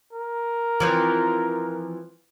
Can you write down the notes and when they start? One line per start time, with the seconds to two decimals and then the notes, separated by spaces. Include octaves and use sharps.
0.13 A#4
0.80 E3 F3 C4